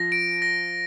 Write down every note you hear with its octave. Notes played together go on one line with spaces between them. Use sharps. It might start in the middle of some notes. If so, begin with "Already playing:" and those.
Already playing: F3 A#6
D7
A#6